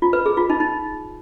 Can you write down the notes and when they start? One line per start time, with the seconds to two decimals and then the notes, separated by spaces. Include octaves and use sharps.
0.02 F4
0.13 B4
0.26 G#4
0.37 F4
0.50 D#4
0.60 D#4